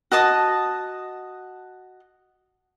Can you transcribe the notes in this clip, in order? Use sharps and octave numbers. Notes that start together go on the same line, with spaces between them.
F#4 D#5 A5 D#6